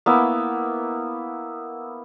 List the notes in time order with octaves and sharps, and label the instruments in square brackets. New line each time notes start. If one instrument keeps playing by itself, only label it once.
[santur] A#3 B3 E4